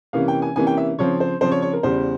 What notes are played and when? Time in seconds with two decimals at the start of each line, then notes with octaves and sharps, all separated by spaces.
0.13 C3 E3 A#3 C#4 F5
0.28 G5
0.42 G#5
0.56 C3 E3 A#3 C#4 G#5
0.67 G5
0.77 E5
0.98 C#3 F3 C4 C#5
1.20 C5
1.41 C#3 F3 C4 C5
1.51 C#5
1.62 C#5
1.73 A#4
1.83 E2 C#3 G3 C5